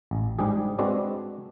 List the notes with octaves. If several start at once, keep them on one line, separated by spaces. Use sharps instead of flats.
A1
G#2 G3 D4 G4 G#4
G#3 C4 D4 F#4 B4 D5